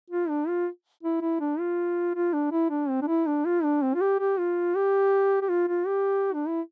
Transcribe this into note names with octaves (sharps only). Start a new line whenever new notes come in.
F4
D4
F4
E4
E4
D4
F4
F4
D4
E4
D4
C4
D4
E4
D4
F4
D4
C4
F4
G4
G4
F4
G4
G4
F4
F4
G4
D4
E4